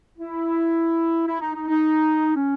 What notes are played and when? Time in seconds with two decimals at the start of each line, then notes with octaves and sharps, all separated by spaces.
0.18 E4
1.27 E4
1.41 D#4
1.55 D#4
1.68 D#4
2.36 C#4